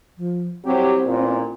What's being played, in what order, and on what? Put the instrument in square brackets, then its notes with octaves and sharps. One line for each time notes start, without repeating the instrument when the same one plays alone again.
[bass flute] F3
[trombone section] C2 F#3 G4 [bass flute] C4
[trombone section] A1 A#2